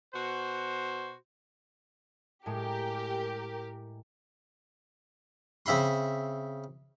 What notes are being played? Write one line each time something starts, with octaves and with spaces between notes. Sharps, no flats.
B2 F#4 C5
A2 G#3 G4 A#4
C#3 C4 E5 B5 C6